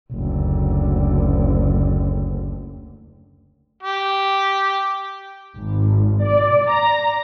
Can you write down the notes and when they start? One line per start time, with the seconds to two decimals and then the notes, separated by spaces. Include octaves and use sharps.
0.12 F#1 D2
3.83 G4
5.55 G#1
6.23 D5
6.70 A#5